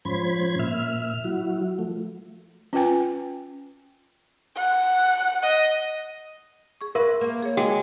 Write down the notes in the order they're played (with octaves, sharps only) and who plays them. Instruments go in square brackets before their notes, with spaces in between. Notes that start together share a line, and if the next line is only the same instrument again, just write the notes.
[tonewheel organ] G#2 F3 C#4 C5 B5 G#6
A#2 E5 F6
F#3 E4 F#4
F3 A3
[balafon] C#4 F4 B4 G5 G#5
[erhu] F#5
[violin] D#5
[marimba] G#4 C#6
[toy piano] A#4 E5 [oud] B4 [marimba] C6
[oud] A#3
[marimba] G#4 C#5
[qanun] G#3 [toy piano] F#4 G5